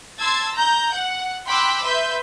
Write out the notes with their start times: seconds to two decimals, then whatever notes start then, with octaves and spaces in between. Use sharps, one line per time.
0.19 A5 C6 E6 G#6 A6
0.54 A#5 G6
0.93 F#5
1.47 G5 B5 C6 D6 E6 F#6
1.83 B4 E5 C6 G6